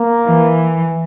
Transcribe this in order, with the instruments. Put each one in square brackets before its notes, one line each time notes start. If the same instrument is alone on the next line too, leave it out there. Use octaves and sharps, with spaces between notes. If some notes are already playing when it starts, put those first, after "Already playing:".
Already playing: [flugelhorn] A#3
[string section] E3